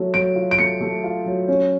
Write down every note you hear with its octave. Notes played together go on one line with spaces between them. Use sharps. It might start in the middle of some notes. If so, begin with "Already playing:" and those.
Already playing: F#3 A3
F#3 D7
F4
D7
A3 C#7
A3
F4
F#3
C#4